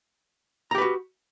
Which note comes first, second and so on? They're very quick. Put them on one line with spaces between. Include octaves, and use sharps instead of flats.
A#5 G4 B4 F#4